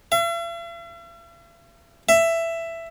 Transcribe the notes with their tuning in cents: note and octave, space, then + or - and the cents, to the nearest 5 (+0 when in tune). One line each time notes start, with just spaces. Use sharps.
E5 +45
E5 +10